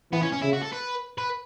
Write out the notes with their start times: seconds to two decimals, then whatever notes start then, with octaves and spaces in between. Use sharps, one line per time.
0.12 E3 B3
0.22 C#4
0.33 C#4
0.42 C#3 E4
0.53 F#4
0.63 A4
0.73 B4
1.18 B4